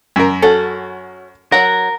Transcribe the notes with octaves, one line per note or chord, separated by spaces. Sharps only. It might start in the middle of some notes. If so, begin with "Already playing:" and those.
F#2 A#4
C#4 F#4 A4
F#3 F#4 A#4 F#5